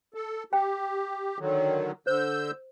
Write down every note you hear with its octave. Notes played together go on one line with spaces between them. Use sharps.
A4
G4 G5
D3 D#3 F#3
D3 C5 E6 G6